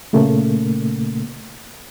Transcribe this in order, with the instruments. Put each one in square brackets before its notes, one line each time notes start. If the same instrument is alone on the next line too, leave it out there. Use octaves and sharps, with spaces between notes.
[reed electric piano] A#2 C#3 A3 A#3